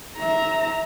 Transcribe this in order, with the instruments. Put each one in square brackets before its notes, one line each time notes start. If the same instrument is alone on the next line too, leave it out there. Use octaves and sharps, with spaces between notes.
[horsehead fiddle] E5 A#5